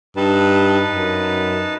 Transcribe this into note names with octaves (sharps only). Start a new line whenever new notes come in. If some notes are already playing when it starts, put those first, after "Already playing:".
G2 D#4 B4 A5
F#2